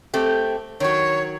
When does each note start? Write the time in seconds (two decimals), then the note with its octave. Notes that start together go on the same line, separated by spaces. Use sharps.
0.14 A3 C4 G4
0.80 D#3 F#3 C#5